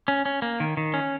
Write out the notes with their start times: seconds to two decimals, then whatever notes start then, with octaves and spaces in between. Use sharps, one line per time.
0.08 C#4
0.26 C#4
0.42 A#3
0.60 D#3
0.77 D#3
0.94 C#4